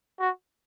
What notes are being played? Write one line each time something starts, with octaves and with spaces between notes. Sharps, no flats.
F#4